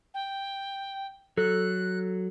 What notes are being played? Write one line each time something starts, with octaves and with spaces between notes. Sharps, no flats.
G5
F#3 A4 F#6